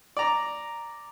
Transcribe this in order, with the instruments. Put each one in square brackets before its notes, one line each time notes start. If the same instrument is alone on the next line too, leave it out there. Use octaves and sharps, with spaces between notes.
[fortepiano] D5 A#5